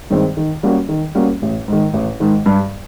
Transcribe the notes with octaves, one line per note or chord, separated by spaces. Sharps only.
G2 D#3 G#3 C4
D#3
G3 A#3 C#4 F#4
D#3
G3 A#3 C#4 F#4
A1
G#2 D#3
A1
G#2 D#3
G2